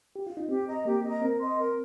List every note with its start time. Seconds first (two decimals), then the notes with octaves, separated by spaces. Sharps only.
0.16 G4
0.27 F4
0.37 D#4
0.48 C4 G4
0.66 D#5 A#5
0.85 A#3 G4
1.03 D#5 A#5
1.22 C4 A#4
1.40 D#5 C6
1.58 A#4